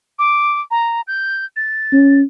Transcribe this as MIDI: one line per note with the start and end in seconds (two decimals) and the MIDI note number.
0.19 0.60 86
0.71 1.01 82
1.07 1.45 91
1.56 2.20 93
1.93 2.23 61